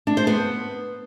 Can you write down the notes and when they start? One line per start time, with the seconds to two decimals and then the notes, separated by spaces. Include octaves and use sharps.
0.07 D4
0.17 C5
0.27 B3